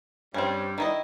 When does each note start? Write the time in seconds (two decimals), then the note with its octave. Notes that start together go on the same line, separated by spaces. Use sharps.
0.34 G2 G3 C4 C#4
0.78 D#3 E4 D#5